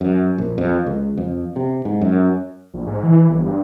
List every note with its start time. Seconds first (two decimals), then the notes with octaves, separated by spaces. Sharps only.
0.01 F#2
0.38 A#1
0.58 F2
0.86 C#2
1.18 F2
1.56 C3
1.85 G#2
2.01 F#2
2.74 A#1
2.87 G#2
3.03 E3
3.30 G1
3.46 G2